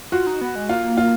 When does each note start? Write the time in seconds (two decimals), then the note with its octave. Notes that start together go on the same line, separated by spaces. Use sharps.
0.12 F4 F#4
0.27 D#4
0.41 B3
0.55 G#3
0.69 A#3 F4
0.97 F4